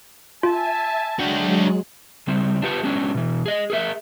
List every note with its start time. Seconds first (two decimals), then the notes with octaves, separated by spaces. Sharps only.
0.43 F4 E5 G#5 A5
1.19 F#3 G#3 D4 F#4 G5
2.27 C#3 G3 C4
2.62 D4 F4 G4 B4 F#5 A5
2.83 F#3 G#3 B3 C#4 D4
3.15 B2 E3
3.46 G#4 D#5
3.70 G#4 A#4 E5